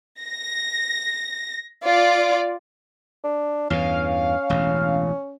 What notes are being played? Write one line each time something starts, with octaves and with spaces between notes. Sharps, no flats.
A#6
F4 D5
D4
E2 G2 E3 C#4 F5
E1 A1 E2